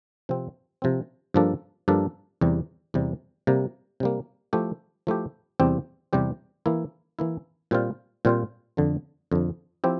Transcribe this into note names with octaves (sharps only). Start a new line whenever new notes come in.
C3 F3 C4
C3 F3 C4
G2 F3 A#3 D4 A4
G2 F3 A#3 D4 A4
E2 C3 G3
E2 C3 G3
C3 G3 A#3
C3 G3 A#3
F3 A3 E4 G4
F3 A3 E4 G4
E2 C3 G3 C4 G4
E2 C3 G3 C4 G4
E3 A#3 E4
E3 A#3 E4
A#2 G3 C4 F4 C5
A#2 G3 C4 F4 C5
F2 D3 F3
F2 D3 F3
F3 C4 E4 G4